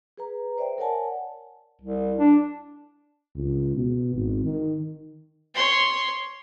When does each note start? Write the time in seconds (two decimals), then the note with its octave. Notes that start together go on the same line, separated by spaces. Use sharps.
0.17 G#4 B4 A#5
0.58 C5 D5 E5 G5
0.78 A#4 C#5 D5 F#5 G#5 A5
1.81 C2
2.19 D4
3.36 C#2
3.76 B2
4.14 G#1
4.45 D#3
5.55 C#5 C6